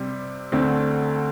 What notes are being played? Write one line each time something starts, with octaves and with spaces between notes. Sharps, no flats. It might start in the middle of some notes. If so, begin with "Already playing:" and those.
Already playing: C3 G3 C4
D2 D3 A3 C4